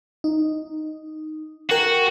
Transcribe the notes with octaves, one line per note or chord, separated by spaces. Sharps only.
D#4
F#4 A#4 G5 G#5